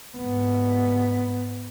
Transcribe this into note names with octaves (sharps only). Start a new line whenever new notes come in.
G#2 B3